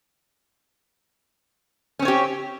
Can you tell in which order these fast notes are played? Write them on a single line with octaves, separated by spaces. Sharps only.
C#4 C4 C#5 G4